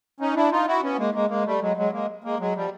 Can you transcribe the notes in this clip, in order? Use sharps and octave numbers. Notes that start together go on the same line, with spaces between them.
C#4 D#4
D4 E4
D#4 F4
E4 F#4
B3 C#4
G#3 A#3
G#3 A#3
G#3 A#3
G3 A3
F#3 G#3
F#3 G#3
G#3 A#3
G#3 A#3
F#3 G#3
F3 G3